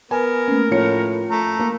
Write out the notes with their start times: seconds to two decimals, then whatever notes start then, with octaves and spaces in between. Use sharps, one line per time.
0.11 B3 A#4 G#5
0.48 A3 A#3 C#4
0.71 A2 F3 C#5 C#7
1.30 A3 A#5
1.59 A#3